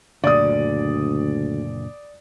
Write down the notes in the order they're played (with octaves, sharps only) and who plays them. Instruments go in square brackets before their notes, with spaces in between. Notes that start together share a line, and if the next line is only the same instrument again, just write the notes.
[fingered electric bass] F#1 A#2 D3 [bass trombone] D2 [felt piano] D5 D#6